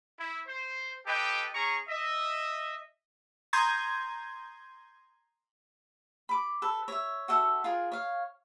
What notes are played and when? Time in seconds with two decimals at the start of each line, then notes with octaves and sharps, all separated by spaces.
0.18 E4
0.46 C5
1.05 G4 A4 B4 D#5 G5
1.54 C#4 G#4 A#5 C#6
1.88 D#5 E5
3.53 A#5 C6 D#6 G6 G#6
6.29 B5 D6
6.62 A4 B4
6.88 C#5 E5
7.28 F#4 A4 E5 F#5
7.64 F4 G#4 A#4
7.92 C#5 F5